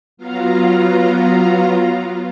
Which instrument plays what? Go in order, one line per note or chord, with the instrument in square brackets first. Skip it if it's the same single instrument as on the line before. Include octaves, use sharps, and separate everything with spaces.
[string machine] F#3 B3 F4 F5 A#5